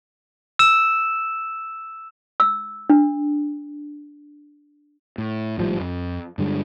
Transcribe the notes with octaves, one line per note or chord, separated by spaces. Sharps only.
E6 E7
E6
D4
A2
G#1 A2 F3 G3
F2
G2 D3 G3 G#3